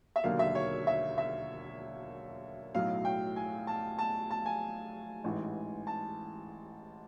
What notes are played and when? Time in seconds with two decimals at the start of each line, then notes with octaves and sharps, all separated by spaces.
0.16 E5
0.24 E1 D#2 D3 F#3 A#3 F5
0.39 E5
0.55 C#5
0.87 E5
1.18 E5
2.75 B1 A2 F#3 F5
3.05 G5
3.36 G#5
3.67 A5
3.99 A5
4.31 A5
4.46 G#5
5.24 A1 G#2 E3
5.87 A5